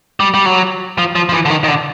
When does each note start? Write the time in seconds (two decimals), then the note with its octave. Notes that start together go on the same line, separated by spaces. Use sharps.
0.20 G3
0.34 G3
0.46 F#3
0.98 F3
1.15 F3
1.29 F3
1.33 E3
1.45 D3
1.50 D#3
1.64 D#3
1.68 D3